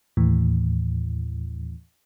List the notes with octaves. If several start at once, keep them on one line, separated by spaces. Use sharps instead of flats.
D#2 A2 E3